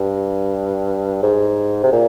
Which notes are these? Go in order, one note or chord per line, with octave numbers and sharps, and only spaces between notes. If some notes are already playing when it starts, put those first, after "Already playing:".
Already playing: G2
G#2
C3
A#2